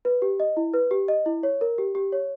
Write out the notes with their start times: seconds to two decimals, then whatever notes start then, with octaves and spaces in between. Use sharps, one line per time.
0.05 B4
0.22 G4
0.40 D#5
0.57 E4
0.73 B4
0.91 G4
1.08 D#5
1.26 E4
1.43 C#5
1.61 A#4
1.78 G4
1.95 G4
2.12 C#5